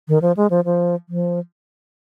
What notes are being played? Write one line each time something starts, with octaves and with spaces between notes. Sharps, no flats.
D#3
F3
G#3
F3
F3
F3